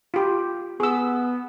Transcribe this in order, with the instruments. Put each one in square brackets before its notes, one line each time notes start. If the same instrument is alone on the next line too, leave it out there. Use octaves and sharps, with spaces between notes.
[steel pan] F4 G4
[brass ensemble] B3 [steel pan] G#4 E6